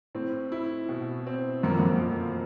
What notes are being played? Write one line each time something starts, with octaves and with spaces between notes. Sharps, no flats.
A2 C4
E4
B2
C4
F#2 A#3
F2
F#2
F3